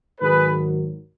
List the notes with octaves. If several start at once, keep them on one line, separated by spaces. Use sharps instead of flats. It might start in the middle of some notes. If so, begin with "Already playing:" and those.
G#2 D#3 F#3 G#4 B4